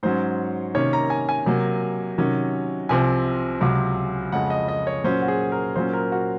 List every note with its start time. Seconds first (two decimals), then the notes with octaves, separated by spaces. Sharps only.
0.03 G#2 F#3 C#4 C5
0.75 C3 D#3 A#3 C#4 C#5
0.93 A#5
1.10 G#5
1.29 G#5
1.46 C3 F#3 A#3
2.18 C3 D#3 F#3 C#4
2.89 C2 C3 F3 C4 G#5
3.61 C#2 C3 F#3
4.32 F2 C#3 G#3 F#5
4.50 D#5
4.68 D#5
4.87 C#5
5.04 A#2 F#3 C#4 C5
5.22 F#4
5.28 G#4
5.52 A#4
5.75 A#2 F#3 A#3 C#4 C5
5.93 A#4
6.12 F#4